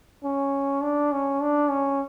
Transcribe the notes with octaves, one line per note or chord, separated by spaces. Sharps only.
C#4
D4
C#4
D4
C#4